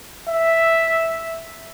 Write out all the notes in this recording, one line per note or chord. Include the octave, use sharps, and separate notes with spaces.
E5